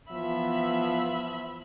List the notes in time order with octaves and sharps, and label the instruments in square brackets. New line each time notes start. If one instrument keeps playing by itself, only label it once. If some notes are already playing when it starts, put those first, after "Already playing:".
[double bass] E3 B3 [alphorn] F3 [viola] E5 B5